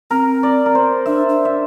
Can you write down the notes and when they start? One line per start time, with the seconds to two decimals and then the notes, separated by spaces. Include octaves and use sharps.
0.11 C4 A#4
0.43 D5
0.66 A#4
0.75 C5
1.06 D4 E5
1.29 D4
1.45 E5